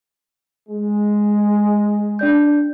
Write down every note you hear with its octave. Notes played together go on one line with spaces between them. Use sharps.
G#3
D4 D5 G6